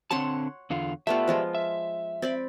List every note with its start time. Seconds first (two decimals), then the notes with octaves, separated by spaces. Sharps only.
0.11 D3 C4 C#5 F#5 A5 C6
0.70 E2 D3 F4
1.07 A3 B3 F4 G4 D5 E5
1.27 F3 G#3 F4
1.55 E5
2.22 C4 D5 B5